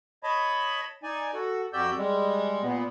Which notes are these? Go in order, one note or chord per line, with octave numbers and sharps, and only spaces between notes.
C#5 D#5 A5 B5
D#4 D5 G#5
F#4 A4
F2 F#4 G4 D5 E6 G6
G3 G#3
A#2 B3